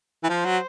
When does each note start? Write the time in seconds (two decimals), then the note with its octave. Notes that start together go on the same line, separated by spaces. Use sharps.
0.23 E3
0.29 F3 C5
0.45 F#3